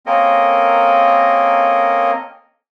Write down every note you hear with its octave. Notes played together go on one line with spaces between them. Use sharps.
A#3 C4 C#4 A4 A#4 D#5